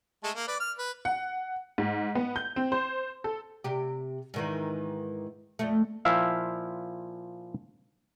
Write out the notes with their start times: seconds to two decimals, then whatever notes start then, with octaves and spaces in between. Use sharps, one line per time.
0.24 G#3 A3 A4
0.36 A#3
0.48 B4 D5
0.60 F6
0.78 B4
1.05 F#5
1.78 G#2
2.15 B3
2.36 G6
2.56 C4
2.72 C5
3.24 A4
3.64 C3 G4
4.34 G#2 D#3 E3
5.59 F2 A3
6.05 A#2 F3 E4 E5 F5